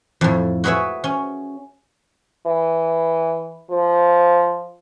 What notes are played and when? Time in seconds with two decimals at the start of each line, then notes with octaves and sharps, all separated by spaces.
0.21 F2 A2
0.64 F#4 G#4 B4 C#5 E5
1.04 C#4
2.46 E3
3.71 F3